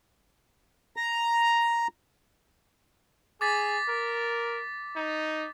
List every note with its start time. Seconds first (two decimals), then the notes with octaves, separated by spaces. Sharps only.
0.96 A#5
3.41 G#4 D6 A6 B6
3.89 A#4
4.96 D#4